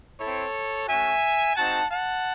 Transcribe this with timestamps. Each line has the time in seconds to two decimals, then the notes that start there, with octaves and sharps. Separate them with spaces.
0.19 C4 E4 A4 C#5
0.87 A3 C#4 F#4 E5 G#5
1.56 G#3 C4 D#4 F#4 F#5 A5
1.90 F#5 A5